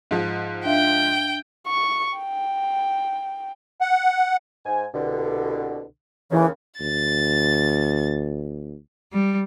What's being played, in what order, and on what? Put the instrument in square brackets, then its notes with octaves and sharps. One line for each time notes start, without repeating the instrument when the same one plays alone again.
[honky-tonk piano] G#2 F3
[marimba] D4 E5 F5 [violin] G5
[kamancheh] C#6
G5
[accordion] F#5
[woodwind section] G#2 G#5
C2 B2 D3
[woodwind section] D#2 C#3 [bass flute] E3
[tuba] D2 [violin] A6
[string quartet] G3